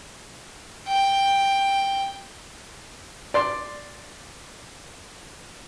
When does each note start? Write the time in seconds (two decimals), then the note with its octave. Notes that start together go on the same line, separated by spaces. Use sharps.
0.88 G5
3.34 D5 C6